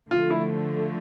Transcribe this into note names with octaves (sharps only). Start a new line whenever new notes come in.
D3 F3 A3 F4
E4